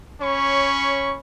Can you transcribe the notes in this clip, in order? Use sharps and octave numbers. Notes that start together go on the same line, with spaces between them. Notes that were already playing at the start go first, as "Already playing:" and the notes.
C#4 C#5 B5 C#6